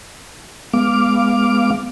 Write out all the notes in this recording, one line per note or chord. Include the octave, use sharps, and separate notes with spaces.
G#3 B3 F5 D6